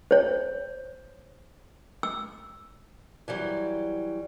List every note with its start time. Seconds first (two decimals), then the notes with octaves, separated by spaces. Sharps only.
0.11 C5 C#5
2.03 E6
3.28 E3 F#3 G3